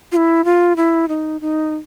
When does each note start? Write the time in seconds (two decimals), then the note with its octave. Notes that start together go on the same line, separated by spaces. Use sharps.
0.12 F4
0.17 E4
0.45 F4
0.76 E4
1.08 D#4
1.41 D#4